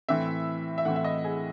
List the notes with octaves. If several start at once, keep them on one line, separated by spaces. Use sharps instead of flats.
A2 E3 C4 E5
E5
A2 E3 C4 F#5
E5
D#5
G#4